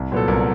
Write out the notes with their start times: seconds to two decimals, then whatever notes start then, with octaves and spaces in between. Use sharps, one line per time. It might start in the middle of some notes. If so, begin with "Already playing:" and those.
Already playing: C2
0.12 A#2 F#3 B3 A4
0.28 C2 A#4